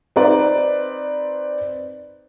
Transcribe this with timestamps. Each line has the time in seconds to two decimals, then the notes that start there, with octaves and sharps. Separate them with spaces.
0.16 C4 D#4 B4 C5 D5